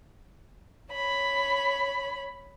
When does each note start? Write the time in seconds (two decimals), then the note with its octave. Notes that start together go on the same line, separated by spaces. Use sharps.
0.92 C#5 B5